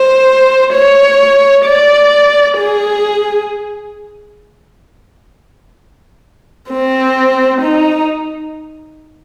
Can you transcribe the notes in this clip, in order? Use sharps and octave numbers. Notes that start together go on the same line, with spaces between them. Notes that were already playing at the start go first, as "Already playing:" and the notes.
Already playing: C5
C#5
D5
G#4
C4
D#4